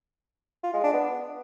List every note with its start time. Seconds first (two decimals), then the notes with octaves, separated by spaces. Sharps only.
0.64 F4
0.73 G#3
0.83 D4
0.93 B3